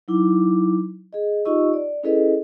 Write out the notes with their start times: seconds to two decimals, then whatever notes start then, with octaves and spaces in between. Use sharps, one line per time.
0.08 F#3 D#4 E4 D6
1.13 G#4 D#5
1.45 D#4 F4 G4 D#5 C#6 E6
1.73 D5
2.03 C#4 E4 G#4 A4 B4 D#5